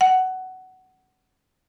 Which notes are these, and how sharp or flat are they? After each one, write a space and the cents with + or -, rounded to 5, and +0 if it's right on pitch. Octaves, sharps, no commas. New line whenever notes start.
F#5 +15